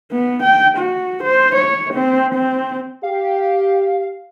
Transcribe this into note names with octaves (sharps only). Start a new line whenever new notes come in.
B3
G5
F#4
C5
C#5
C4
C4
G4 F5